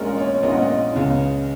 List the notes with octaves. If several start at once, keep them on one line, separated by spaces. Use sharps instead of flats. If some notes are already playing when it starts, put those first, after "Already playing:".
Already playing: A#1 A#2 G#3 C#4 A#4
C#5
A#1 A#2 G#3 C#4 D#5
F#5
D#5
C#2 C#3 G#3 C#4